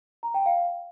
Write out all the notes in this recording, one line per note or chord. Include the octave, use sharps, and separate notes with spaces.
A#5
G5
F5